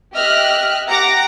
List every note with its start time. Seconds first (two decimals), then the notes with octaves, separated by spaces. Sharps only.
0.14 G4 D#5 E5 F6 F#6
0.89 G4 F#5 A#5 D6 A#6